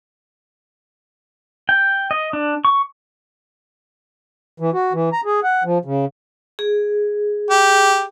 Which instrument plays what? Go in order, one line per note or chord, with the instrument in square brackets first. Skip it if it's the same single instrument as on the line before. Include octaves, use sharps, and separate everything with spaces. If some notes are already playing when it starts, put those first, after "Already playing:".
[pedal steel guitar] G5
D#5
D4
C#6
[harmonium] E3
F#4
E3
A#5
G#4
F#5
F3
C#3
[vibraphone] G#4
[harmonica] G4